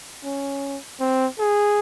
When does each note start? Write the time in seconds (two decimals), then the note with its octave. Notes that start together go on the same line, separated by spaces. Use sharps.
0.24 C#4
1.00 C4
1.39 G#4